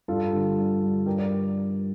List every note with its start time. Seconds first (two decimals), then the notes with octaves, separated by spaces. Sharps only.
0.08 G2 F4 A4
0.33 D3 G3
0.57 G2
0.82 D3 G3
1.06 G2 G4 A#4
1.18 A#4 D5